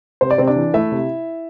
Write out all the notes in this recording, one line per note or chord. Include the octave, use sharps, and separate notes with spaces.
C3 C5
D5
C3 C4 C5
D4 D5
E3
A3 E4 E5
C3